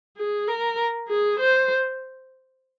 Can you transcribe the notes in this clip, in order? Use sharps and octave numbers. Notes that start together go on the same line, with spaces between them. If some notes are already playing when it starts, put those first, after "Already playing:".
G#4
A#4
G#4
C5